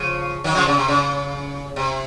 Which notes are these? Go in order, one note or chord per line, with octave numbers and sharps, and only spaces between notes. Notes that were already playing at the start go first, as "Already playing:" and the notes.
Already playing: C#3 F3
D#3 F#3
C#3 F3
C#3
C3
C#3
C3